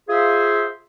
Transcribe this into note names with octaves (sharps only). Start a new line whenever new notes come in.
F4 G#4 C5 E5